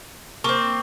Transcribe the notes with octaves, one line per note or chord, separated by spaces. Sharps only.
A#3 C4 C#6